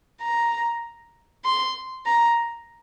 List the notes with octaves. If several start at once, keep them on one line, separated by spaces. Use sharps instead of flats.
A#5
C6
A#5